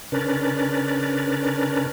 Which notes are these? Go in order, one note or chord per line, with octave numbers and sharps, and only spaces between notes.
C#3 C#4 D4 A#4 B4 A6